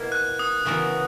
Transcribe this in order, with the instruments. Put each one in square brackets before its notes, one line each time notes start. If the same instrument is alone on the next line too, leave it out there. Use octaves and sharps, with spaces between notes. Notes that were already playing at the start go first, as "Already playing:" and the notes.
Already playing: [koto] B2 A#3 E4
[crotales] F#6
D#6
[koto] C#3 E3 B3 F#4 A#4 [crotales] D#6